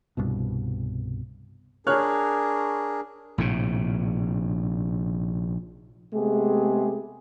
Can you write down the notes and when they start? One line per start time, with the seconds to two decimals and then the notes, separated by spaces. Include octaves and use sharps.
0.17 C2 G2 B2
1.87 D4 G#4 A#4 C#5 F6 F#6
3.38 A#1 A2 C3
6.13 C3 G#3 A3 B3 G4 G#4